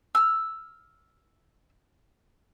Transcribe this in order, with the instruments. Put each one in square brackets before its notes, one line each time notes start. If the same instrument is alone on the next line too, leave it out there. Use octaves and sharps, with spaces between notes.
[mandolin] E6 F6